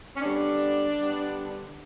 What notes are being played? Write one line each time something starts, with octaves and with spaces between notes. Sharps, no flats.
C#4
D3 G3 B3 D4
D3 G3 B3